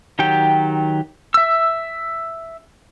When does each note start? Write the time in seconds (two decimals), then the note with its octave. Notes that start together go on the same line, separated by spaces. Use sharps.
0.19 D#3 F#3 G4 G5
1.34 E5 E6